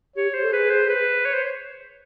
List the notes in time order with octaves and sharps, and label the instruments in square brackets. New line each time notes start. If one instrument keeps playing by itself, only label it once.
[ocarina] G4 [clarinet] C#5
[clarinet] C5
[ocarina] A4
[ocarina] G#4 [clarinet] B4
[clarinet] C5
B4
C#5
C5